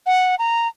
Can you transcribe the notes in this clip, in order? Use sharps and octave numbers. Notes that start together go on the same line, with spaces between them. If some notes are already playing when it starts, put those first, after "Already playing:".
F#5
A#5